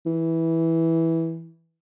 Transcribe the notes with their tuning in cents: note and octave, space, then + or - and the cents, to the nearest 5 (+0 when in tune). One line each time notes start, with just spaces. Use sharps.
E3 -10